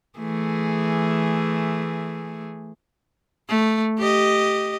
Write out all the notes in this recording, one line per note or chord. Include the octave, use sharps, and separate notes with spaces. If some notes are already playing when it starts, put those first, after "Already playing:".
E3 A3 G#4
A3
G4 D#5